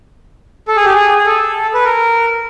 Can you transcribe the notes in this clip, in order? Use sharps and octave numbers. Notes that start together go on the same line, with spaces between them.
A4
G#4
G4
G#4
G#4
A4
B4
A#4